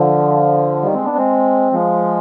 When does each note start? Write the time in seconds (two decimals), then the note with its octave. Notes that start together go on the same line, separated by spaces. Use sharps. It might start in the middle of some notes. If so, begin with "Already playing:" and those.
Already playing: D3 F3
0.83 D#3 G3
0.94 G#3 C4
1.05 B3 D4
1.16 G#3 C4
1.72 F3 G#3